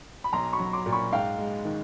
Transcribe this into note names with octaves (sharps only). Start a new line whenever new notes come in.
B5
B1 A#5 C6
B5 C#6
F#3
C6 D6
A#2
B5 C#6
G#2 F5 G5
G#3
D#3